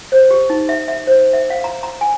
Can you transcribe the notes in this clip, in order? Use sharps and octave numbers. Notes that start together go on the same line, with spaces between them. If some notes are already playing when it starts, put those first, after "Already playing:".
C5
G4
D#4
E5
E5
C5
E5
F5
A#5
A#5
G#5